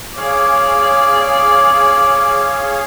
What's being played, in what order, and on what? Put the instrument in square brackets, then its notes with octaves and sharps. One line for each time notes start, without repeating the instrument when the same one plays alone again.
[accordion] G#4 C#5 F5 [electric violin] D5